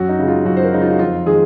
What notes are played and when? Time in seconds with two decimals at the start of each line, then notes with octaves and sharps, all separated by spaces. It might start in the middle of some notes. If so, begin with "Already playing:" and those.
Already playing: F#2 F#4
0.09 D#4
0.19 C#3 G#3
0.28 F4
0.45 F#2 F#4
0.57 C5
0.63 A#4
0.72 C#3 G#3 D#4
0.82 F4
0.90 F#4
0.99 F2 F4
1.26 D#3 G#3 G#4